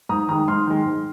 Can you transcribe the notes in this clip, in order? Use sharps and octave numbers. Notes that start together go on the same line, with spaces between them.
G#2 A#5 D#6
D#3 G#3 A#5 D#6
G#2 C6 F6
D#3 G#3
G#2